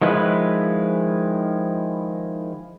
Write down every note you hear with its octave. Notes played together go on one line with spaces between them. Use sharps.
D#3 F3 G#3 E4 B4